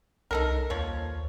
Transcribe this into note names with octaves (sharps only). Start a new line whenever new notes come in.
C2 D#4 A4 A#4
D#2 F3 C#5